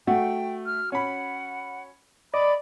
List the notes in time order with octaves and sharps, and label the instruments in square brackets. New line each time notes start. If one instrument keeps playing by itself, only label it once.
[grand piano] A3 [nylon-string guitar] F#4 [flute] G5
[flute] F6
[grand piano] C#4 B5 [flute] F#5
[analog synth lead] D5 [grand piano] D#5 [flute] B5